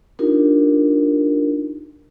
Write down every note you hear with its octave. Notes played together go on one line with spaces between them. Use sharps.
D4 D#4 F4 G4 A#4